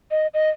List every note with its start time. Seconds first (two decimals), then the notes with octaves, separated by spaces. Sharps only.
0.11 D#5
0.34 D#5